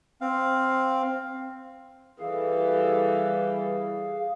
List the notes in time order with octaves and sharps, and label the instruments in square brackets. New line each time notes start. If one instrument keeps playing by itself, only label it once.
[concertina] C4 F5
[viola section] E3 G3 A4 [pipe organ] G#4 F5